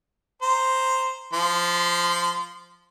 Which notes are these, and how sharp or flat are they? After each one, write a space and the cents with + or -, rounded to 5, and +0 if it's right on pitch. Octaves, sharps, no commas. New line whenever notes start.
C5 +0 A#5 +0
F3 +0 C6 -25